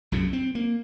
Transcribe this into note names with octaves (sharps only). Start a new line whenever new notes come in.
B1 F#2 A2 C3
C4
A#3